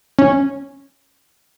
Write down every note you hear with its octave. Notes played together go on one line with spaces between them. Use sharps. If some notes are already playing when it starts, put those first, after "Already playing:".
C#4